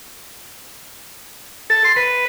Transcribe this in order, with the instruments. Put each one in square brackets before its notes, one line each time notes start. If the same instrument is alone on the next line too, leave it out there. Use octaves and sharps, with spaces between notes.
[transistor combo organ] A4
C6
B4